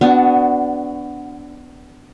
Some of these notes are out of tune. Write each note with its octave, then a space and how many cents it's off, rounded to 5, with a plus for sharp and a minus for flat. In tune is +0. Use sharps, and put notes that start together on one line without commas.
B3 +25 D4 -5 F#4 +0